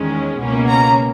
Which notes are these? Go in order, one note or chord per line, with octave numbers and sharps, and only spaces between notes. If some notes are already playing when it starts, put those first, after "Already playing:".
Already playing: E2 D#3 G#3 C#4
C#2 B2 A#3 C#4
A#5